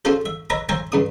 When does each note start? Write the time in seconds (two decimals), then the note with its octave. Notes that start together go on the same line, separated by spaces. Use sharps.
0.05 C#4 F4 F#4 G#4 A4 C5
0.26 E5
0.50 B4 C#5 D#5 E5 A#5 B5
0.69 C5 C#5 E5 F5 G#5 A#5
0.92 G2 C#3 D#6